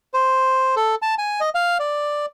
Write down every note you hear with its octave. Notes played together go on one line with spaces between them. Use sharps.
C5
A4
A5
G#5
D#5
F5
D5